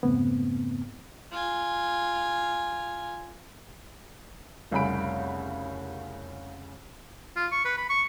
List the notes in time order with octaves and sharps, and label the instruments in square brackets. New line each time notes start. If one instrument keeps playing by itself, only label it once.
[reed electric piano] F2 G#2 C#3 A3 B3 C4
[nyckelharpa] F4 G#5
[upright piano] F1 C2 C#3 G#5 B5 D7
[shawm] F4
C#6
B4
B5
C#6